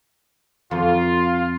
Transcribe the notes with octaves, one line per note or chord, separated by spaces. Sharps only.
F2 F4